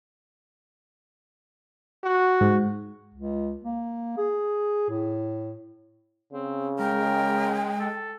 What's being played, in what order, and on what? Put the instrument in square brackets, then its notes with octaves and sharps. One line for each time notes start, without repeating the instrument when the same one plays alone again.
[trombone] F#4
[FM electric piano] G#2
[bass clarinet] C#2
A#3
G#4
A2
[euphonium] C#3 [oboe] C4
[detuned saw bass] G#3 [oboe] A#4 [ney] G5
[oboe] A4